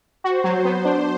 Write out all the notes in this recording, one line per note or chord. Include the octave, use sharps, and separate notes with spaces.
F#4 C5
F#3
B3
D4